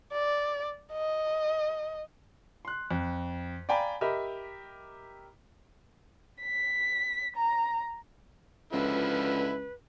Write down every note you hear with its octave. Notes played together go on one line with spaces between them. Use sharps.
D5
D#5
C6 F#6
F2
D5 F5 G5 G#5 A#5 B5
G4 A#4 D#5 E5 B5
B6
A#5
C#2 D3 F3 E4 B4